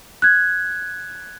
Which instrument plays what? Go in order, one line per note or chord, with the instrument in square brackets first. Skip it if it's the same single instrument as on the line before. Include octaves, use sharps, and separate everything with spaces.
[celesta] F#6 G#6